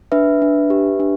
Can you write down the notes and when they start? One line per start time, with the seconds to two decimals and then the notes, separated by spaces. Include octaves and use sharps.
0.12 D4 B4 E5
0.42 D4
0.70 G4
1.00 D4